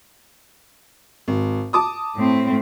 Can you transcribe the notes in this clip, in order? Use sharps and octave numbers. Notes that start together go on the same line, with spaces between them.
G#1
A5 D6 D#6
A2 C4